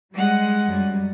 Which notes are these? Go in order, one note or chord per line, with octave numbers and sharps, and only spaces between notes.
G3 G#3 F#5
F#2 F#3 G3